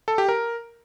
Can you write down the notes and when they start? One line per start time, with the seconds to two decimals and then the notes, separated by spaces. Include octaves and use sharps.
0.08 A4
0.18 G4
0.29 A#4